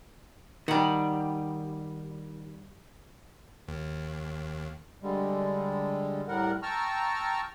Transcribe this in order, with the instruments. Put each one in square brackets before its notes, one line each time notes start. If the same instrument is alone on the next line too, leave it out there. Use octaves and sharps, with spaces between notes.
[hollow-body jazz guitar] D#3 [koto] G3 F#5
[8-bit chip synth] D#2
[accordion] D3 G3 G#3
A2 G3 A#4 F#5
G5 A5 A#5 C#6 E6 F6